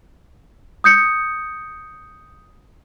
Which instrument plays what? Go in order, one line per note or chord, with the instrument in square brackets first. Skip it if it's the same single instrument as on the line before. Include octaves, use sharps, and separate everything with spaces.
[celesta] D#6 G6 C#7